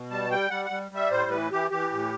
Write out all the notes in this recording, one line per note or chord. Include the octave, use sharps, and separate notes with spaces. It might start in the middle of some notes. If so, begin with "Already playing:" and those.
Already playing: B2
G3 A5
G3 G5
G3 F#5
F#5
G3
G3 E5
A2 C5
E3 B4
E3 G4
E3 G4
A2